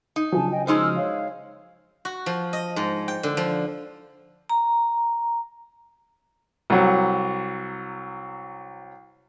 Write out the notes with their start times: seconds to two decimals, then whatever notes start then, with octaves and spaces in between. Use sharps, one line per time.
0.16 D#4
0.32 C#3 F3 F#3 D4 G#5 A5
0.51 D#5 G5 G#5
0.67 G#3 D#4 C5 E6 F6
0.96 C#5 F5
2.05 F#4
2.26 F3
2.53 D#5
2.76 G#2
3.08 G5
3.23 D3
3.37 F3
4.50 A#5
6.70 C2 F#3